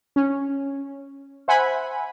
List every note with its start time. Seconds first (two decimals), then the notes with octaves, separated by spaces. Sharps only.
0.16 C#4
1.48 C5 E5 F#5 G#5 B5